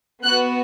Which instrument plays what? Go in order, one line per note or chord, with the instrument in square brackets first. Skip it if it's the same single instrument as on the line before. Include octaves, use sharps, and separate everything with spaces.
[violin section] B3 F#4 F#6